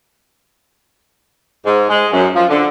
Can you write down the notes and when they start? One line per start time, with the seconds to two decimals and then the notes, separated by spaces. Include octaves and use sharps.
1.65 G#2
1.89 G#3
2.12 F#2
2.35 F3
2.50 D3